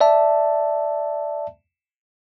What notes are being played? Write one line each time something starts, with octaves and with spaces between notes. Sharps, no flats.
D5 E5 A5